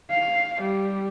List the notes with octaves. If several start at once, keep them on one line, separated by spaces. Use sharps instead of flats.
F5
G3